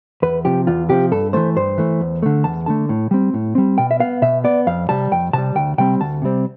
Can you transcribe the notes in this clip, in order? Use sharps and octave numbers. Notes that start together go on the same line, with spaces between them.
E2 B4
C3 F3 G4
E2 F4
C3 F3 G4
G2 A4
E3 A3 C5
G2 C5
E3 A3
E2
D3 A3
E2 A5
D3 A3 A5
A2
G3 C4
A2
G3 C4
B2 G5
E5
B3 F5
B2 E5
B3 D5
F2 F5
C3 G3 A5
F2 G5
C3 G3 A5
D2 G5
C3 G3 C4 G5
D2 A5
C3 G3 C4